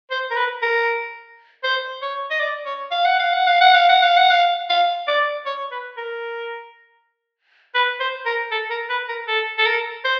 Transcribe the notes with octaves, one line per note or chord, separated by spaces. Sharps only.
C5
A#4
B4
A#4
C5
C#5
D#5
D5
C#5
F5
F#5
F5
F#5
F5
F#5
F5
F#5
F5
F#5
F5
F5
D5
C#5
B4
A#4
B4
C5
A#4
A4
A#4
B4
A#4
A4
A4
A#4
C5